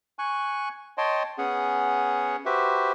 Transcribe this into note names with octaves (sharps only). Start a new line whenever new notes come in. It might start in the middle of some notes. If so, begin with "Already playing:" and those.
G#5 C#6 F#6
C#5 D#5 G5 A5 C6
B3 C#4 G#4 F#5
F#4 G4 B4 C5 E5